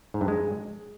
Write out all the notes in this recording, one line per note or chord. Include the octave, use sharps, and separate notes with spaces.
G#2
G2
G#3